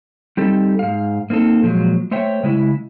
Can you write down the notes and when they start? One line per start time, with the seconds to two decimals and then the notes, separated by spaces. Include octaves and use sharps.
0.37 G3 C4 D#4 G4 A4
0.79 G#2 F5
1.30 A#3 C4 D#4 A4
1.63 A#2 F3 F#3 G#3
2.11 A3 C5 C#5 E5 G5
2.43 C#3 G#3 E4